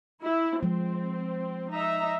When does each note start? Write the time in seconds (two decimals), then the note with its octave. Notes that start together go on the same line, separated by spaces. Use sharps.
0.23 E4
0.63 F3 G#3 C4
1.72 D#4 E5 A#5